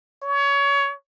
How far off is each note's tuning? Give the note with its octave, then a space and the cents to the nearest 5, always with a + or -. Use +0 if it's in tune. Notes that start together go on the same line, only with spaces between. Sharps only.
C#5 +25